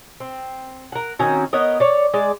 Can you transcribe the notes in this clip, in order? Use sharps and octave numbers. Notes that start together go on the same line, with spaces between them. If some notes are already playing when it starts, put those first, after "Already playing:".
C4
A#4 F#5
D#3 C4 C#4 F#4
B3 A#4 C#5 D#5
C#5 D5
G#3 D5